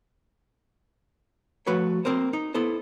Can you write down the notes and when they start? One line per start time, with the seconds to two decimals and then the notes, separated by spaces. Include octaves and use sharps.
1.67 F3 A3 F#4 B4 C#5
2.05 A#3 C4 A#4 C5
2.33 D#4
2.54 B3 E4 A4 C5